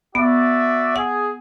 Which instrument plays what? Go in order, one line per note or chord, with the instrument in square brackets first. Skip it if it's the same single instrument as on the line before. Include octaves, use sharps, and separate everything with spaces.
[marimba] B3 [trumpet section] F#4 D5 E5
[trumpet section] G#4 [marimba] F#5